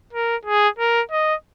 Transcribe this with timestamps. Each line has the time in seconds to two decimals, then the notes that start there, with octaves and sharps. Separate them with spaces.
0.13 A#4
0.45 G#4
0.79 A#4
1.11 D#5